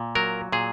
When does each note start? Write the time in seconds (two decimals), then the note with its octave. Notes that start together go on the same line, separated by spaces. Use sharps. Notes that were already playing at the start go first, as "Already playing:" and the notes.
Already playing: A#2
0.15 F#3 A#4
0.52 A#2 G#4